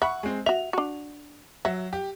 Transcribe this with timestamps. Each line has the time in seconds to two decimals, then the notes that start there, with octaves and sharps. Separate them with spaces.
0.02 E5 F#5 B5 C#6
0.23 G#3 C4
0.46 F#4 E5 F7
0.73 D4 F#4
1.65 F#3 E5 F#5
1.93 G4